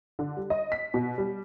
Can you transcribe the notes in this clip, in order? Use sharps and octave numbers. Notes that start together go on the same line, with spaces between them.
D3
G3
D#5
B6
B2
G3